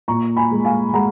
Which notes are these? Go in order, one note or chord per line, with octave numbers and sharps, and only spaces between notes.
A#2 A#5 C#6
G#5 B5
G#3
F5 G#5
G#3 F#5 A#5